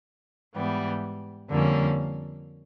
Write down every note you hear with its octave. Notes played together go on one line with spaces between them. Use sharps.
G#2 E3 G3 B3
F2 D3 G3 A#3 C#4